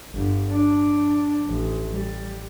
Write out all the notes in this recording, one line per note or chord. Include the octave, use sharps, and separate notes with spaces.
G1 G2
D4
A1
G3